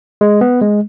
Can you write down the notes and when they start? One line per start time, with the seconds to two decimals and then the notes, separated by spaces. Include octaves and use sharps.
0.21 G#3
0.41 B3
0.61 G#3